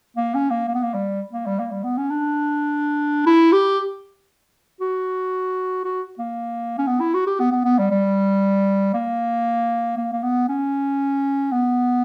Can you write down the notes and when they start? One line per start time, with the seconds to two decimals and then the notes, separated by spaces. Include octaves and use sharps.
0.17 A#3
0.35 C#4
0.51 A#3
0.68 A#3
0.75 B3
0.83 A#3
0.94 G3
1.33 A#3
1.46 G3
1.59 A#3
1.71 G3
1.84 B3
1.98 C#4
2.11 D4
3.27 E4
3.53 G4
4.81 F#4
5.85 F#4
6.19 A#3
6.79 C#4
6.87 B3
7.00 E4
7.14 F#4
7.27 G4
7.40 B3
7.52 B3
7.65 B3
7.79 G3
7.91 G3
8.94 A#3
9.98 A#3
10.13 A#3
10.23 B3
10.49 C#4
11.52 B3